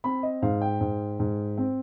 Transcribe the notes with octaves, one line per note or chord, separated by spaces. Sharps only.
C4 B5
D#5
G#2 F5
G5
G#2
G#2
C4